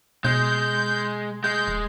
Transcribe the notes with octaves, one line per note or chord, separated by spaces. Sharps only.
B2 G#3 G6
G#3 G6
D#1